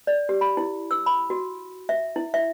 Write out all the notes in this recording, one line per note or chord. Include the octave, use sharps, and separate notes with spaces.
D5
G4
B5
E4
E6
B5
F#4
E5
E4
E5